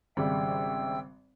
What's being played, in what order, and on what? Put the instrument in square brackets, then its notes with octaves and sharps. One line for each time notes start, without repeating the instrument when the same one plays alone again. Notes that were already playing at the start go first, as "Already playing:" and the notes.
[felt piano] G#1 C#3 G3 [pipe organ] E5 G5 E6